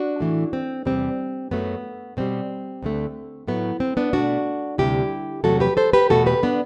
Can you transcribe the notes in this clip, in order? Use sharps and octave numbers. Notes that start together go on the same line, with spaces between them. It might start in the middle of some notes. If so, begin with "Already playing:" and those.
Already playing: D4 F#4
A2 E3 A3
C4
E2 C3 G3 C4
F#2 F#3 A3 B3
B2 G3 C4
D2 D3 A3
A2 F#3 A3 B3
C4
B3 D4
B2 A3 D4 F#4
D2 C3 G3 E4 G4
E2 C3 F#3 A3 F#4 A4
G4 B4
A4 C5
G4 B4
E2 B2 A3 F#4 A4
G4 B4
B3 D4